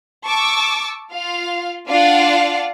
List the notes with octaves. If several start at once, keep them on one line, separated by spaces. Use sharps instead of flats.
A5 C#6 D6 E6
F4 F5
D4 F4 D5 F5 F#5 A5